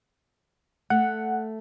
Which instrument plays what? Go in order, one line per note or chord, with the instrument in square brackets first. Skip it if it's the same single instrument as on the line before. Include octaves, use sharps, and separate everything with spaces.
[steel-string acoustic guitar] A3 [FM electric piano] F#5